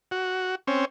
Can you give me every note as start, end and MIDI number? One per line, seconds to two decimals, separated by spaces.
0.11 0.55 66
0.67 0.85 60
0.67 0.85 61